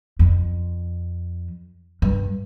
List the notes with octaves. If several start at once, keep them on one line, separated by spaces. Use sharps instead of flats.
F2
G2